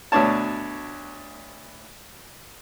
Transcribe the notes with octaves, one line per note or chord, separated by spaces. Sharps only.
D2 B2 D4 C#5 A5